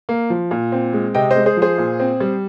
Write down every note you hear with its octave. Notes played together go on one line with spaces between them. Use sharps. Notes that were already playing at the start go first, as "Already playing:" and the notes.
A#3
F3
A#2
C4
G#3
C3 D#5 G5
C5 D#5
G#3
G#4 C5
F3
G#4 C5
A#2
C4
G3